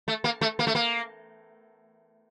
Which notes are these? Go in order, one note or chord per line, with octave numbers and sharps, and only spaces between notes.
A3
A#3
A3
A#3
A3
A#3